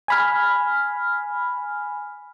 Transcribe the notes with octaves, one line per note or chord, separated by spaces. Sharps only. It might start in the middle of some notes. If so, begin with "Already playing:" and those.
G#5 B5 F6